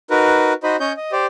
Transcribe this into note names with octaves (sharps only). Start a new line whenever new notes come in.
D#4 F#4 A#4 B4
D#4 F#4 C5 D#5 B5
C#4 C#5 D#5 G6
D#5
G4 C5 D5